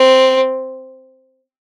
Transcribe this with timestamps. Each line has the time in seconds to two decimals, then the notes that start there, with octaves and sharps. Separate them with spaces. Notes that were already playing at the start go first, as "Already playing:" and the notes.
Already playing: C4